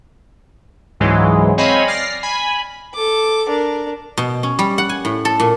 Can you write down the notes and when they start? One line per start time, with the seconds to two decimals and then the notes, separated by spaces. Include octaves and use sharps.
1.00 C#2 G#2 E3 F#3 G#3
1.58 C4 C#5 D#5 F5 G#5 B5
1.87 D5 F6 A#6 C7
2.23 G#5 B5
2.95 A4 D6
3.48 D4 A#4
4.17 B2
4.43 C#4
4.59 G3
4.78 F#5
4.89 G#5
5.05 A2
5.25 A4
5.40 A#2